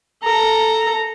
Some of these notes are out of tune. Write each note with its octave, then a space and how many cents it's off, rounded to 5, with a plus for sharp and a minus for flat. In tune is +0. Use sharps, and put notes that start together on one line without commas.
A4 +0 A#5 -10